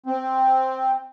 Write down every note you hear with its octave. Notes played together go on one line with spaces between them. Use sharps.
C4